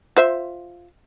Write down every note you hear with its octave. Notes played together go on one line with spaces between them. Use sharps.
F4 C5 E5